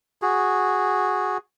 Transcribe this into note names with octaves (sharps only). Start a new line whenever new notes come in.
F#4 G#4